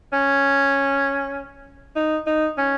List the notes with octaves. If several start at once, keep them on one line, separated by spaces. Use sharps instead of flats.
C#4
D#4
D#4
C#4